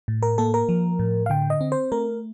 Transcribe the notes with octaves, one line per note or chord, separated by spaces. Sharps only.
A2
A#4
A#3 A4
A#4
F3
A2
F5
D3 G5
D#5
C4
C5
A3 A#4